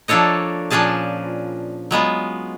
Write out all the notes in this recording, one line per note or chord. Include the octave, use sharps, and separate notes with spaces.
F3 A#3 D4 A4 C#5 D#5
A#2 F3 C#4 D4 G#4 A5
F#3 G#3 B3 F4